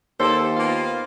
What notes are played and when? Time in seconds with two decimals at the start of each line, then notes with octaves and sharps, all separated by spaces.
0.20 D#2 A#3 G4 A4 C5
0.57 A#3 B3 F4